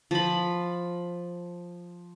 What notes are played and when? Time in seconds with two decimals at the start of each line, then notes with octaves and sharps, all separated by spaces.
0.11 F3 B5